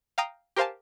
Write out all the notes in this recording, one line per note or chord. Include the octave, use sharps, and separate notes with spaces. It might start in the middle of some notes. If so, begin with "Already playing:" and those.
F5 G5 A#5 D#6
G4 A#4 C5 F5 G#5 A5